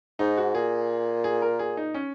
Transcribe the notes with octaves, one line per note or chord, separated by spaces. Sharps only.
G#2 D#4
F#4
A#2 G#4
G#4
A#4
G#4
D#4
C#4